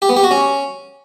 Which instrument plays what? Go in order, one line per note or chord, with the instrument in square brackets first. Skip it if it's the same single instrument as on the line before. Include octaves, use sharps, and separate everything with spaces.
[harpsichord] G4
B3
G4
F#4
C#4